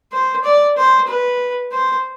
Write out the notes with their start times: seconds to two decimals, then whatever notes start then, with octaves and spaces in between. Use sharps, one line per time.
0.13 C5
0.44 D5
0.77 C5
1.08 B4
1.72 C5